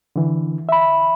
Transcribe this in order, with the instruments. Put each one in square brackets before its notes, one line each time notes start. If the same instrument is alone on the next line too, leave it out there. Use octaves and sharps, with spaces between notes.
[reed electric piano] D3 E3
E5 B5